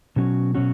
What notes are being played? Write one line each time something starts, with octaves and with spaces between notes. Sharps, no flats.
B2 F#3 C#4 F#4
B2 F#3 C#4 F#4